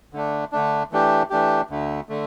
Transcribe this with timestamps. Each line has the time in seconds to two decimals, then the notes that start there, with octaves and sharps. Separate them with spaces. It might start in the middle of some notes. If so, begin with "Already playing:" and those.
0.13 D3 A3 D4
0.52 D3 A3 D4
0.92 E3 A3 D4 G4
1.30 E3 A3 D4 G4
1.70 D2 D3 A3
2.09 D3 A3